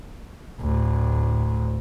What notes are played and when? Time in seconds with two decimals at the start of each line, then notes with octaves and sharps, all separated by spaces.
0.61 D2 A2